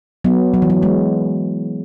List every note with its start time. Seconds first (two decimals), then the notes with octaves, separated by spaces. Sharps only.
0.24 F#3 B3
0.54 F#3
0.62 E3
0.70 F#3
0.82 G#3